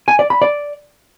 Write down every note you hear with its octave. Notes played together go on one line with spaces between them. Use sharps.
G#5
D5
B5
D5